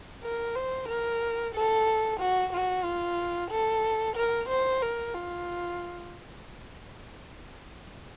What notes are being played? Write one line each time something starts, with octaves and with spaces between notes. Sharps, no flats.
A#4
C5
A#4
A4
F#4
F#4
F4
A4
A#4
C5
A#4
F4